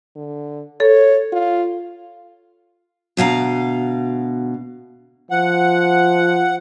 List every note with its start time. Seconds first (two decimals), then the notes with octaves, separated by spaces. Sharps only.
0.16 D3
0.80 A4 C#5
1.32 F4
3.17 D2 B2 F5 A#5
5.31 F3 F#5